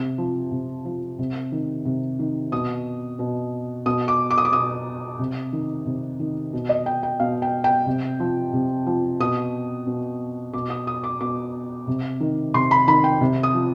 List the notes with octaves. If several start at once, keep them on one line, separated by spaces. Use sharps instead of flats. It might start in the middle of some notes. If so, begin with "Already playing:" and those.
Already playing: C3
F3
C3
F3
C3
D#3
C3
D#3
B2 D#6
B2
B2 D#6
D6
D6
D#6
D6
B2 D#6
C3
D#3
C3
D#3
B2
D#5
G5
G5
B2 F5
G5
G5
C3
F3
C3
F3
B2 D#6
B2
B2 D6
D#6
D#6
D6
B2 D6
C3
D#3
C3 C6
B5
D#3 B5
G5
C3
D#6
F3